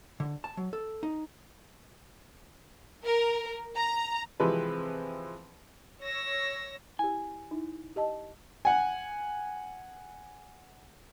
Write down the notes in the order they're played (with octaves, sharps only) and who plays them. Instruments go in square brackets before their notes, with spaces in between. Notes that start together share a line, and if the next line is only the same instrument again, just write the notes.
[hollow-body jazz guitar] D3
A5
F#3
A4
D#4
[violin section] A#4
A#5
[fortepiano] C3 E3 F3 G#3 C4 B4
[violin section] C#5 E6 A#6
[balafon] E4 G4 [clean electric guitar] G#5
[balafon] D#4 E4
G4 D#5 A5
[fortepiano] F#5 G#5